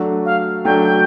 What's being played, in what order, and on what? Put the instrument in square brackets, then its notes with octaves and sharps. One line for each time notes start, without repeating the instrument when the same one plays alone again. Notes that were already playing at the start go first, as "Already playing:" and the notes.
Already playing: [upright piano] F#3 A3 D4 F#4
[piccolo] F5
[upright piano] F#3 A3 D4 F#4 [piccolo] G5